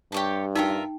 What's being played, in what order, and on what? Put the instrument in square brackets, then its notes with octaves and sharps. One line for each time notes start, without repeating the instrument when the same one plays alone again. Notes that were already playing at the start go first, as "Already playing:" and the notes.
[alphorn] G2 [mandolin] G4 C#5 A5
[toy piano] D#4 G5 [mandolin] F4 A#4 E5